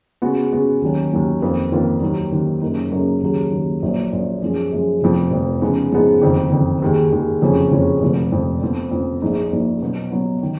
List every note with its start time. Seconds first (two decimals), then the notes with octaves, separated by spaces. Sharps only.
0.22 C#3 G#3 B3 F#4
0.52 C#3 G#3 B3 F#4
0.82 D#2 D#3 F#3 C#4
1.12 D#2 D#3 F#3 C#4
1.42 F2 D#3 A#3 F4 B4
1.72 F2 D#3 A#3 F4 B4
2.02 D#2 D#3 F#3
2.32 D#2 D#3 F#3
2.61 F#2 C#3 F#3 A#3 D#4
2.91 F#2 C#3 F#3 A#3 D#4
3.22 D#2 C#3 F#3
3.52 D#2 C#3 F#3
3.82 A#1 A#2 F#3
4.12 A#1 A#2 F#3
4.42 F#2 F3 G#3
4.72 F#2 F3 G#3
5.02 F1 F2 F3
5.31 F1 F2 F3
5.61 C#3 F3 G#3 B3 D#4
5.92 C#3 F3 G#3 B3 D#4
6.22 F#1 F2 D#3
6.51 F#1 F2 D#3
6.82 D#2 D#3 G#3
7.12 D#2 D#3 G#3
7.42 F#1 F2 F3 G#3 C#4
7.71 F#1 F2 F3 G#3 C#4
8.01 F1 F2 F3
8.32 F1 F2 F3
8.62 F2 F3 B3
8.91 F2 F3 B3
9.22 A#1 A#2 F3 G#3 D#4
9.52 A#1 A#2 F3 G#3 D#4
9.82 B2 F#3 B3
10.11 B2 F#3 B3
10.43 D#3